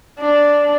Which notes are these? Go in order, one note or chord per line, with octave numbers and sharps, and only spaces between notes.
D4